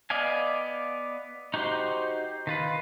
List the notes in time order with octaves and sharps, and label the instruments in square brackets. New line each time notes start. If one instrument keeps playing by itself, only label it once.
[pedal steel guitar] B3 D5 D#5 F5 G#5
D#4 F#4 G4 C5 C6
D#3 F4 B4